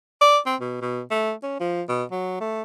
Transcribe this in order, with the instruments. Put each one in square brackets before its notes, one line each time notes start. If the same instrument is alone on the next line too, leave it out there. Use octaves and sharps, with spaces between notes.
[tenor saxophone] D5
C4
B2
B2
A3
C#4
F3
B2
F#3
A3